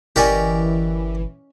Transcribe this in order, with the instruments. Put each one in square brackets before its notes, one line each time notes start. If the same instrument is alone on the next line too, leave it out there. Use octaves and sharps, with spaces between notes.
[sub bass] G1 [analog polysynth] E3 [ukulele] C#4 D#5 G#5 [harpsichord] G4 A#4 D5